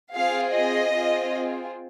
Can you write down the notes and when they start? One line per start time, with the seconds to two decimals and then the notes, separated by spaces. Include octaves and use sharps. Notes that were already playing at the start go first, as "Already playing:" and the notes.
0.15 C4 F4 G#4 F5
0.54 D#5
0.93 C4 F4 G#4